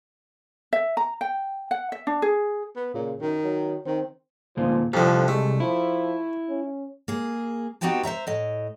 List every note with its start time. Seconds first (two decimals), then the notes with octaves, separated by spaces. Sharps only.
0.73 E5
0.97 A#5
1.21 G5
1.71 F#5
1.92 E5
2.07 D4
2.22 G#4
2.76 B3
2.94 A#2 C#3
3.21 F#2 D#3
3.44 F#3
3.86 D#3 C4
4.57 D2 A#2 F3
4.94 C2 F2 D3 F3 G4 A5
5.28 G#3 A3
5.60 F3 E4
6.50 C#4
7.08 A#3 G#4
7.81 B3 D#4 F#4 G4 G5 A5
8.03 C5 D#5 E5 A#5
8.27 A2 D#5